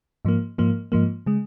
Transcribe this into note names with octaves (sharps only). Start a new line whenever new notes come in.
G#2 F3 A#3
G#2 F3 A#3
G#2 F3 A#3
C#3 G#3